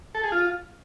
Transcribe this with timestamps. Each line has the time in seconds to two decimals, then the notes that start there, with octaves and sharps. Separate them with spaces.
0.15 A4
0.23 G#4
0.32 F4